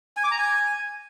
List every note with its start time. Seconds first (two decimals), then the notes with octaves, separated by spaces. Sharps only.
0.17 G#5
0.24 D6
0.31 A#5
0.38 G#5